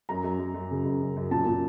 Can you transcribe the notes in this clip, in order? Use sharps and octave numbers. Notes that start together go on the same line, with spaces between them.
F#2 A#5
F#2
F#2
F#2
C#3
F#2
F#2
F#2
A#2 A5
A#2